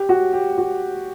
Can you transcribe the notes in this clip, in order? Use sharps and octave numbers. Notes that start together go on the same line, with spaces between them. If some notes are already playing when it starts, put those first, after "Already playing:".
Already playing: G4
F#4
G4
F#4